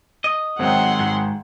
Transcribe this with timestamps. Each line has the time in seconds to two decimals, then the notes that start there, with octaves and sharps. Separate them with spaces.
0.24 D#5
0.59 G#1 D#3 F#3 G#3 C4 F#5 G5 C6
1.00 G#2